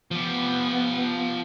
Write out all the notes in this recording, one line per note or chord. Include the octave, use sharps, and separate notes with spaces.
F3 B3 G4